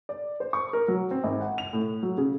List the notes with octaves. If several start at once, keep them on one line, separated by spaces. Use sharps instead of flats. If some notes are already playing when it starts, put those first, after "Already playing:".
D5
C5
C#6
A#4
F#3
C4
G#1
F#5
F7
A2
F#3
C#3